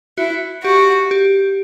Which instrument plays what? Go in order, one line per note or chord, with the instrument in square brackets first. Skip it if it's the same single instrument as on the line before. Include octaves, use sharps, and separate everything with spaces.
[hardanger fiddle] E4 [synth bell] F#4
[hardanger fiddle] F#4 [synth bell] G4
[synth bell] G4